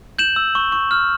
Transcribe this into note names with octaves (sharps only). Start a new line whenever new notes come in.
G6 E7 F#7
E6
C#6
C#6
F6